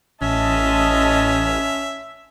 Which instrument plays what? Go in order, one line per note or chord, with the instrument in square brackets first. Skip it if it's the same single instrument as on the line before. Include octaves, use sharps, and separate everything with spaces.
[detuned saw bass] A1 [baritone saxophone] C#4 [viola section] D#5 A5 C6 [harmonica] E5